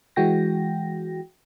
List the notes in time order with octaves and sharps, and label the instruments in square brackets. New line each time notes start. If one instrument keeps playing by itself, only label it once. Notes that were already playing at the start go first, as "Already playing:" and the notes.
[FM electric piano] E3 G#3 F#4 G5 A#6